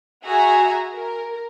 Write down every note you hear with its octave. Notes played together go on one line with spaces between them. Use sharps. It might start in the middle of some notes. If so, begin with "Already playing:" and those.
F#4 G#4 E5 G#5 A#5
A#4